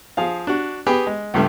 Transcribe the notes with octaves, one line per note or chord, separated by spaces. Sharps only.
F3 G#4 F5
D4 F#4
B3 G4 G#4 G5 B5
G#3
C#2 G2 G3 A3 E5